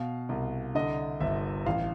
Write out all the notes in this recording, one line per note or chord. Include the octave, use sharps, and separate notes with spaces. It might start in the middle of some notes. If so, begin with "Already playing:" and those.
Already playing: B2 F5
C2
D3 D#5
G1 E5
A1 F5